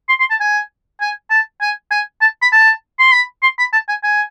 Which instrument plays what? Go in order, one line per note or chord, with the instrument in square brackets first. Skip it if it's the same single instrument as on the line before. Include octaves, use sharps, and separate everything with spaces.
[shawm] C6
C6
A5
G#5
G#5
A5
G#5
G#5
A5
B5
A5
C6
B5
C6
B5
A5
G#5
G#5